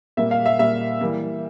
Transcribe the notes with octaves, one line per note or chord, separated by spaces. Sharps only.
A#2 G3 A#3 E5
F5
E5
A#2 G3 A#3 E5
E3 G3 A#3